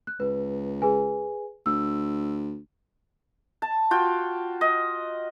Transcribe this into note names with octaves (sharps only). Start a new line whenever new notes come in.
F#6
C#2 B4
G#4 B4 G#5
D2 E6
A5
F4 F#4 G5
D#5